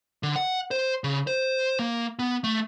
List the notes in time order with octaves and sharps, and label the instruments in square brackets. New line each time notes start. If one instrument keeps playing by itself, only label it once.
[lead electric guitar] D3
F#5
C5
C#3
C5
A#3
B3
A3